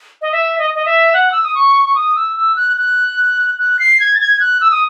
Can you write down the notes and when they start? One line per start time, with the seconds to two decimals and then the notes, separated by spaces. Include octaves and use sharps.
0.22 D#5
0.32 E5
0.59 D#5
0.75 D#5
0.86 E5
1.14 F#5
1.32 E6
1.44 D#6
1.55 C#6
1.85 C#6
1.95 D#6
2.16 E6
2.36 E6
2.56 F#6
2.77 F#6
3.59 F#6
3.79 C7
4.00 G#6
4.14 A6
4.21 G#6
4.32 G#6
4.40 F#6
4.61 E6
4.71 D#6